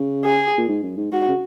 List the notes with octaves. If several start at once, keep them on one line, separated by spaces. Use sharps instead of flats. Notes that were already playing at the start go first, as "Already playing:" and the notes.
Already playing: C#3
G#4
A#2
G#2
F#2
G#2
G#2 F#4
C#3